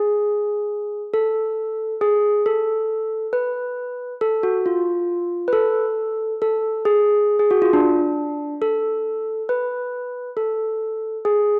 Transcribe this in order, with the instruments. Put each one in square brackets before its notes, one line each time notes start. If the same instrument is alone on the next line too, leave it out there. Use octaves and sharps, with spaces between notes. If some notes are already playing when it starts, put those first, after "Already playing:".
Already playing: [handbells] G#4
A4
G#4
A4
B4
A4
F#4
F4
B4
A4
A4
G#4
G#4
F#4
F4
D4
A4
B4
A4
G#4